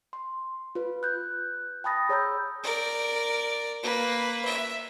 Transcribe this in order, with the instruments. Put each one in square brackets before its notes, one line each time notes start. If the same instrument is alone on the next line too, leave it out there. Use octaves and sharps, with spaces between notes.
[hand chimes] C6
F4 B4
F#6 G6
G5 A5 B5 D#6 A6 A#6
G#4 C#5 A#5 E6 G6
[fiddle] A#4 D5
A#3 B4
E5